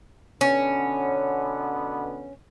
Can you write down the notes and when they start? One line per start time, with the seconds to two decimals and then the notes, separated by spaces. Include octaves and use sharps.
0.41 B2 D3 B3 C#4